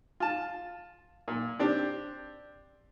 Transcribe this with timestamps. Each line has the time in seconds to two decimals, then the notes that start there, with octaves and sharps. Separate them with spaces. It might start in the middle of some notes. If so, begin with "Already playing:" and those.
0.20 F4 A5
1.28 A#2
1.59 C4 D4 G4